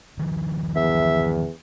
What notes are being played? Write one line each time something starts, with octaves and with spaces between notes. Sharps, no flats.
E1 D#3 F3
E2 E5